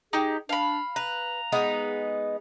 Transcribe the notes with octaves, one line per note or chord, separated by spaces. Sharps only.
D#4 G4 G#4
D4 F5 B5
B4 A#5
G#3 B3 D#4